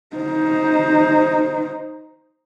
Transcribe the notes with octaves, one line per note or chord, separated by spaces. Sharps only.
D#4 C5